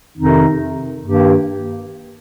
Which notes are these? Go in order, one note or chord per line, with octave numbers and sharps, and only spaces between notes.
F2 C3 D#3 C4 D#4
G2 D#3 A#3 G4